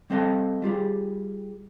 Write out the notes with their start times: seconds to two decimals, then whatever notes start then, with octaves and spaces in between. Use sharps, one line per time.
0.10 G3 C4 A4 D#5 F5 A5
0.62 G3 F4 G4 G#4